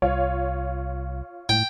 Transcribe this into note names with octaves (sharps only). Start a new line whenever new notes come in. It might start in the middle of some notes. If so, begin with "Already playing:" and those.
C2 F4 C#5
A2 G5